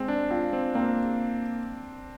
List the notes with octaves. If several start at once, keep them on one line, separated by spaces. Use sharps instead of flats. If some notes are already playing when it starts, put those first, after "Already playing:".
Already playing: G#3 C4
D4
C4 F4
C4
A#3 C4